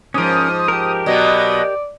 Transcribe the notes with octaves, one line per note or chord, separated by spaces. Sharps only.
G#2 F3 C#4 A#4 D#6
G4 A#4
B2 F#3 B3 D5 D#5